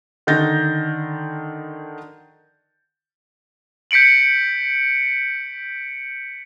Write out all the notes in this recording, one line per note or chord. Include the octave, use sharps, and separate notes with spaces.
D3 D#3 D#4 G6 A6 A#6
G6 B6 C#7 D7 F#7